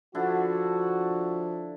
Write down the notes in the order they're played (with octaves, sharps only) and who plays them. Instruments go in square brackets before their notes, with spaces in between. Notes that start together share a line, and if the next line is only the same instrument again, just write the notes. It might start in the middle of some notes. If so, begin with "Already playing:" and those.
[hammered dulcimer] D3 D4 E4 [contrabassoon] F3 [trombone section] F#4